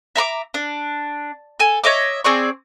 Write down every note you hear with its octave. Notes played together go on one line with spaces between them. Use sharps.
E5 A#5 C6 D6
D4
A4 G#5
C#5 D#5 E5 D6
C4 G#4 D5 C#6